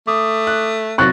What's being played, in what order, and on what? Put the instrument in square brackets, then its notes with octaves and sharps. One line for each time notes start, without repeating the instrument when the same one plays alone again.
[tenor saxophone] A3 [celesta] D6 D#6
[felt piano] F#6
[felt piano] C3 F#3 [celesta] C6 A6 A#6 [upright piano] C#6 F#6